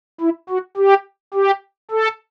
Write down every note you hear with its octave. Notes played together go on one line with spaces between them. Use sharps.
E4
F#4
G4
G4
A4